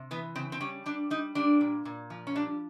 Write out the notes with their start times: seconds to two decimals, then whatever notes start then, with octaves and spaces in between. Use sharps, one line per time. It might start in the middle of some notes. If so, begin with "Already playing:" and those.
Already playing: C3
0.11 E3 B3
0.36 C#3 C4
0.52 C4
0.61 G3 C#4
0.86 G3 D4
1.10 G3 D#4
1.35 G3 D4
1.61 A#2
1.85 A#2
2.10 F3
2.27 C#4
2.35 G3 D4